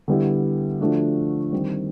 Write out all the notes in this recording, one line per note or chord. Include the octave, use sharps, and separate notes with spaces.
D3 G3 B3 E4 G4
D3 F3 A3 D4 F#4
D#3 G3 C4